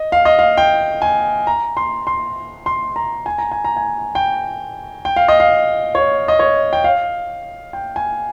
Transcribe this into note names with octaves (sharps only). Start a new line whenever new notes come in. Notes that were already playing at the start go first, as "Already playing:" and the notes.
Already playing: D#5
F5
D#5
F5
G5
G#5
A#5
C6
C6
C6
A#5
G#5
A#5
G#5
A#5
G#5
G5
G5
F5
D#5
F5
C#5
D#5
C#5
G5
F5
G5
G#5